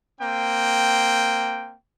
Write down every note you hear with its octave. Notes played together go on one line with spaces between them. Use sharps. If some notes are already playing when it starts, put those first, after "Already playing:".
A#3 C4 G5